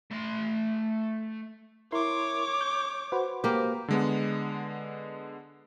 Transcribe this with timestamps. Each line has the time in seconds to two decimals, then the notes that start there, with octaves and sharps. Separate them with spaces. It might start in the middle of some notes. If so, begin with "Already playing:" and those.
0.11 A3 C6
1.92 E4 A#4 C#5 C6 D6
2.61 G6
3.12 F#4 B4 C5
3.44 A#3 G4
3.88 D3 G#3 B3